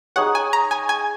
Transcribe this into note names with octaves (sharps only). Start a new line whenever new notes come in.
D#4 G#4 C#5 F#5
G#5
A#5
G#5
G#5